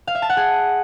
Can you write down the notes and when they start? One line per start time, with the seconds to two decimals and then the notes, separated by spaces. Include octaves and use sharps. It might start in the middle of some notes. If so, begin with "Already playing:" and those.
0.07 F5
0.15 E5
0.22 A5
0.30 F#5
0.37 G#4